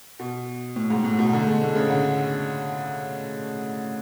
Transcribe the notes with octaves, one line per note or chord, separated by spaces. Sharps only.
B2
A2
G#2
A2
B2
D3
A3
G#3
A2
C#3
D3